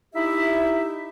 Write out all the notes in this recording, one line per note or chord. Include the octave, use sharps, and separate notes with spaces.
D#4 E4 G4 E5